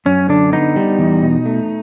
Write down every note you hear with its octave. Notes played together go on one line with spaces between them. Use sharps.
F#2 C#4
D3 D4
B3 D#4
G3
E2
B2
A3